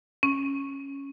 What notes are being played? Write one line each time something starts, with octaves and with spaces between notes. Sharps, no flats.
C#4